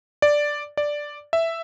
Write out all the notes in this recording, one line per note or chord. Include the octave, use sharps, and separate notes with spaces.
D5
D5
E5